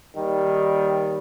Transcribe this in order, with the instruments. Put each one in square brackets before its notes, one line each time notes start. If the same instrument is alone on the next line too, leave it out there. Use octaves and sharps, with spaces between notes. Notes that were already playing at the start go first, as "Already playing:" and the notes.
[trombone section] D#2 D#3 G3